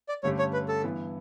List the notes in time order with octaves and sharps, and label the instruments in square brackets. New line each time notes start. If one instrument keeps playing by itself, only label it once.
[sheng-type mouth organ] D5
[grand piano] G2 D3 A3 C#4 G4 [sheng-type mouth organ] C#5
[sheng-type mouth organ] C#5
B4
A4
[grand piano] G2 E3 B3 E4